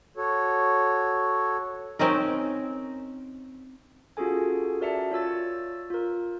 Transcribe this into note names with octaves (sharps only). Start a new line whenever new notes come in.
F#4 A4 C#5
C4 C#4 D#4 A#4
C#4 F4 F#4 G#4 A4 G#5
F#4 A#4 D5 E5 A5 C#7
F4 C#5 E6 A6
F4 A#4